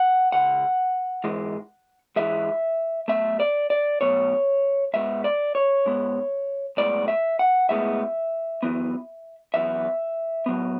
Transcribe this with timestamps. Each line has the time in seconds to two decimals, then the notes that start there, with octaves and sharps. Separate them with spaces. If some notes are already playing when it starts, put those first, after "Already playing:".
Already playing: F#5
0.32 C#2 C#3 F#5
1.24 G#2 E3 G#3
2.16 G#2 E3 G#3 E5
3.08 B1 B2 F#3 A3 E5
3.40 D5
3.70 D5
4.01 B1 B2 F#3 A3 C#5
4.94 G#2 G#3 B3 E5
5.24 D5
5.55 C#5
5.86 G#2 G#3 B3
6.77 B1 A2 G#3 B3 D5
7.08 E5
7.39 F#5
7.69 B1 A2 G#3 B3 E5
8.63 F#2 E3 B3
9.54 F#2 E3 B3 E5
10.46 A2 F#3 B3